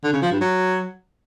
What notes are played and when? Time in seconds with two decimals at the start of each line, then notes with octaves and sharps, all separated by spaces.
0.04 D3
0.13 C#3
0.22 F3
0.32 G2
0.41 F#3